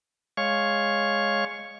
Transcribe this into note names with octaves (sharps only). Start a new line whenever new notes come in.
G#3 C#5 F5 C#6